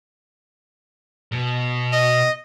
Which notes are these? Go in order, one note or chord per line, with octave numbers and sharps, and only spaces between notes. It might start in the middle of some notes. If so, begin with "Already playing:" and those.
B2
D#5